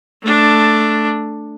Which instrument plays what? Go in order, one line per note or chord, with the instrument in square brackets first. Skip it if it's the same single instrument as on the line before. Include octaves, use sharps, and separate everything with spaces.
[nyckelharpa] A3 D4